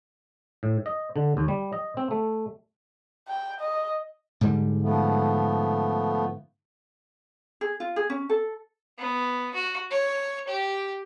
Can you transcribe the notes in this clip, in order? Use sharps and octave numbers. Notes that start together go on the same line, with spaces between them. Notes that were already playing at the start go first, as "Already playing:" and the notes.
A2
D#5
D3
D#2
G3
D#5
C4
A3
G5
D#5
G#2 D3 G3
F3 A3 B3
G#4
F4
G#4
C#4
A4
B3
F#4
C#5
G4